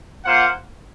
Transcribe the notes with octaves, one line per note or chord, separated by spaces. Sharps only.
A#3 F4 C5 F#5